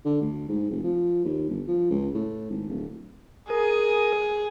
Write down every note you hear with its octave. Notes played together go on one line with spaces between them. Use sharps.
D3
D2
G#2
F1
F3
D#2
G1
F3
C#2
A2
G#1
D1
G#4 A#4 D#6